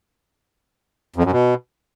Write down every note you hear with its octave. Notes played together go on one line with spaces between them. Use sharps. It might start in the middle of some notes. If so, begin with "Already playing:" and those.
F2
F#2
B2